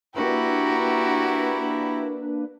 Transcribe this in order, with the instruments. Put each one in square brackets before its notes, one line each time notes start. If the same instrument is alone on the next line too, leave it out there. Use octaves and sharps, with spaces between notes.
[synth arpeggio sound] A#3 D4 B4 [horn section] E4 [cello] F#4 [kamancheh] G4 A#5